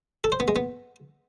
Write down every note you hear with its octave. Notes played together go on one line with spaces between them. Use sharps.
A4
C5
B3
G#3
B3